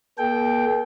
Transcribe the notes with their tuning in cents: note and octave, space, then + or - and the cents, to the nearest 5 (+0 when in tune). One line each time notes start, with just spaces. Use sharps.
A#3 +45 A4 -35 G5 +0